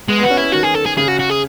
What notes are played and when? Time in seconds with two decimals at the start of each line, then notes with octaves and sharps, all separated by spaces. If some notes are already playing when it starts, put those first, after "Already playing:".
0.08 G#3 B3
0.19 B3 F#4
0.30 C#4
0.37 B3 E4
0.53 D#3 F#4
0.63 G#4
0.75 A4
0.86 G#4
0.97 C#3 G#4
1.08 F#4
1.20 F#4
1.30 G#4